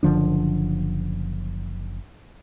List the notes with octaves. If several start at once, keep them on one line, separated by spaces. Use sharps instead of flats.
F#1 D3 F3 D4